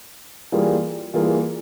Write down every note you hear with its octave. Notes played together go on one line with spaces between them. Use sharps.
E3 G3 A#3 F4 G#4
E3 G3 A#3 F4 G#4